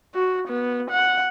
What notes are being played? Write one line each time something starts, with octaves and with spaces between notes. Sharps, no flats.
F#4
B3
F#5